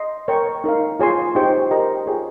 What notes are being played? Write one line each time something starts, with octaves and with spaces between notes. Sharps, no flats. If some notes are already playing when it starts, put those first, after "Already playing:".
Already playing: D#5 C6
A#4 C#5 G5 C#6
D#4 A#4 F5
F4 G#4 C#5 G#5 C6
D#4 G4 C5 G5 C#6
G4 A#4 D#5 A#5
F4 G#4 C#5 G5